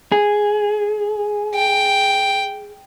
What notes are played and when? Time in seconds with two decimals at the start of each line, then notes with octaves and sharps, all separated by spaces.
0.12 G#4
1.55 G5